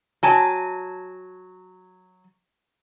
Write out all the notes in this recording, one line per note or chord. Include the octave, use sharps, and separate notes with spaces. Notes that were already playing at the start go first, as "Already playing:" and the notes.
F#3 G#5 A5